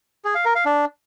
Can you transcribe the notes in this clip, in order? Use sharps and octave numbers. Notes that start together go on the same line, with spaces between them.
G#4
F5
A#4
F5
D4